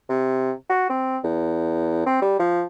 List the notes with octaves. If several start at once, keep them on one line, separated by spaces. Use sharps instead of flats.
C3
F#4
C4
E2
C4
G3
F3